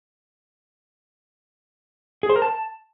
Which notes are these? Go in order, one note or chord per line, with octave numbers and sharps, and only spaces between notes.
G#4
C5
A#4
A5